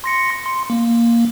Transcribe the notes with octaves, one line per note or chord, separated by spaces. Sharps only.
C6 A#6 C#7
C6
A#3